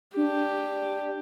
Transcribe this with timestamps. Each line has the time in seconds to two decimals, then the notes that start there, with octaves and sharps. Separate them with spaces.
0.16 D4 G4